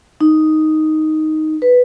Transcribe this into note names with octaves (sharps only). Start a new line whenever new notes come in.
D#4
B4